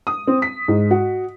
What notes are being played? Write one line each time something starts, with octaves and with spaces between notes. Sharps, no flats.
D#6
C4
B6
G#2
F#4